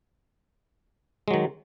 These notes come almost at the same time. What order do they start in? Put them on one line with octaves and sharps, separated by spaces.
G#3 F#3 D#3